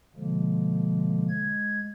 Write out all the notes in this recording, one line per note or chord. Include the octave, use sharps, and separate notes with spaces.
B2 D3 F3 G#3 A#3
G#3 G#6